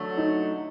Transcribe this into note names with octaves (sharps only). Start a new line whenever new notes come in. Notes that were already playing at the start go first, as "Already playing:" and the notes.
Already playing: D3 F#3 A3
D#4